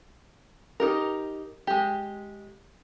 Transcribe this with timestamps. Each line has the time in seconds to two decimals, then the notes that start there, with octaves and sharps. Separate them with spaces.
0.80 D#4 G4 A#4
1.67 G#3 G4